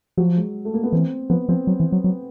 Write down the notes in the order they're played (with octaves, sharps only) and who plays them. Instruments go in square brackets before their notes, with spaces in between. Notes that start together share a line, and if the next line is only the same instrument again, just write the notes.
[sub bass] F3 [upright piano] F#3
[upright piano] G#3
A3
A#3
B3
[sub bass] E3 [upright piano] C4
[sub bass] F3 [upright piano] B3
[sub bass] F3 [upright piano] C4
[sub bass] F#3
E3
F#3
F#3